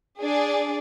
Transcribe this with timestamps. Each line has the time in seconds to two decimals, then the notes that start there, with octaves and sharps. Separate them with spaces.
0.20 D4 G#4 D5